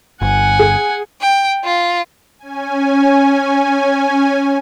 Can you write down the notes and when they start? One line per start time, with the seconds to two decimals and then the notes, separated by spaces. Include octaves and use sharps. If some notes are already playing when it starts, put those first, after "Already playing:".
0.22 G1 F#5 G#5
0.59 G#4
1.21 G5
1.64 F4
2.39 C#4 G#5